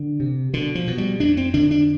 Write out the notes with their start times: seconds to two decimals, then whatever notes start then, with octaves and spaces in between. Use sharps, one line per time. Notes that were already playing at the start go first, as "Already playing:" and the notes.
Already playing: D3
0.20 C3
0.54 B2 D3
0.75 F3
0.87 B2
0.98 G3
1.20 F2 D4
1.37 C4
1.54 D3 D4
1.71 D4